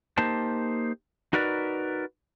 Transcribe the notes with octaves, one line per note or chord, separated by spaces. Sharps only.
A#3 D#4 G4 C5 A5
D#4 F#4 A#4 B4 D5